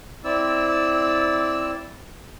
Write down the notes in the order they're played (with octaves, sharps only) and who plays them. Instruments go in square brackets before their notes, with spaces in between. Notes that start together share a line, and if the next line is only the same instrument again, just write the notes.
[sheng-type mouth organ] C4 E4 D5 E6